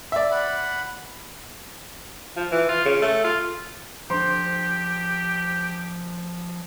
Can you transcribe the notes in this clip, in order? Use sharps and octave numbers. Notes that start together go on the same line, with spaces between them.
D5 E5
F#5 B5
F3
E3
F4
C#3
A3
F4
D3 F3 G4 C5 C6